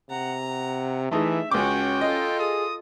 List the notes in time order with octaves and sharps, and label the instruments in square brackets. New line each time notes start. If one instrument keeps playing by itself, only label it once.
[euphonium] C3 [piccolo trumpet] F#5 [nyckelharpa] A#5
[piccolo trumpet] F#5
[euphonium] E3 [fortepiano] A3 D#4 G#4 [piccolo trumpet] E5
[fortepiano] C#2 D6 [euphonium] C#4 [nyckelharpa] F#4 C#5 [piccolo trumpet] G5
[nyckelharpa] F4 A4 [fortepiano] D#5
[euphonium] G#4 [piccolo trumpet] D#6